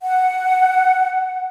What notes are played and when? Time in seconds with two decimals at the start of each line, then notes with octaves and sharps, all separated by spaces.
0.02 F#5